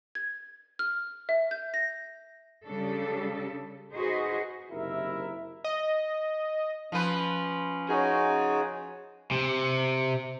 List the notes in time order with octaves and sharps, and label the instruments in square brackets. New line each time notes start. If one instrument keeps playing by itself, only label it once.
[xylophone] G#6
F6
E5
G6
A#6
[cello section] C#3 G3 D4 A4
D#4 F#4 G#4 B4 C5 D#5
[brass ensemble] F#1 C3 D#3 E4 A#4 E5
[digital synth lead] D#5
[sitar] F3 B4 [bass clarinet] C#4
[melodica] D#4 F#4 G#5 [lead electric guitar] G#4 C#5
[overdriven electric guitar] C3